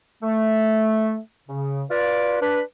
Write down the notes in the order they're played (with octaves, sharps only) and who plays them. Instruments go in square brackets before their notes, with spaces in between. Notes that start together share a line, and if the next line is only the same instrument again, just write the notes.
[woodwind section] A3
C#3
F4 B4 D5
D4 B4